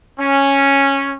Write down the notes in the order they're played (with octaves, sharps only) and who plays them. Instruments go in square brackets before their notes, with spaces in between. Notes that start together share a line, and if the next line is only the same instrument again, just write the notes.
[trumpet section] C#4